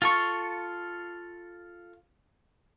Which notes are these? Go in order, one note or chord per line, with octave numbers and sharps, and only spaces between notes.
F4 A4 C#6